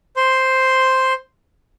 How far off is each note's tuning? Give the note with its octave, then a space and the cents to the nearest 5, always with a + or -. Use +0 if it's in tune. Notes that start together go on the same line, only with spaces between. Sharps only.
C5 +0 C6 +0